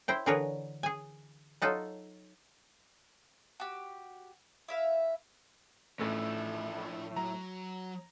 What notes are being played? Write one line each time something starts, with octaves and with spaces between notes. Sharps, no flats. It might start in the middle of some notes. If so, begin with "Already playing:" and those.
E4 C5 G5
D3 E3 G#4 A#4 B4 C#5
G#4 G#5
F#3 D#4 F4 A4
F#4 G4
E4 E5 F5
A1 A2 F3 A3 D4 E6
F#3 A#5